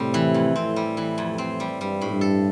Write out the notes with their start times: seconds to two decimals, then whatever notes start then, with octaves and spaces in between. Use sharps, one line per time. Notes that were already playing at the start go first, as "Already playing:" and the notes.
Already playing: A2 C3 G3 C4
0.14 E3
0.34 F2
0.56 A2 C4
0.76 G3
0.97 E3
1.18 F2
1.38 C4
1.60 G3
1.80 G2 G3
2.01 A2
2.11 G2
2.21 A4